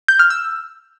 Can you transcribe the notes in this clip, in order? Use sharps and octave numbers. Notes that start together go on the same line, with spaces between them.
G6
F6
E6